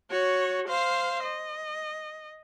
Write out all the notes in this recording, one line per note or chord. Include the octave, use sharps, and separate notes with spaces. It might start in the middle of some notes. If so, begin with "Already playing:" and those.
F#4 C#5
C5 F5
D#5